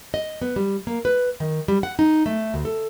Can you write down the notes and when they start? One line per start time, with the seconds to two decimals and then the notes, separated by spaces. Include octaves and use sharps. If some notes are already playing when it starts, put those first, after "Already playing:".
0.14 D#5
0.42 B3
0.56 G3
0.87 A#3
1.05 B4
1.40 D#3
1.68 G3
1.83 F#5
1.99 D#4
2.26 A3
2.54 D2
2.65 A4